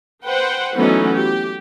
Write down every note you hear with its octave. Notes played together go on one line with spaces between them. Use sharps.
B4 C5 F#5 G5
E3 F#3 A3 B3 C#4 D#4
G4